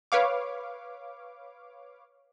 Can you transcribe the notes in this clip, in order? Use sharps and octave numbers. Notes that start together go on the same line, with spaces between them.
B4 C#5 F5 D6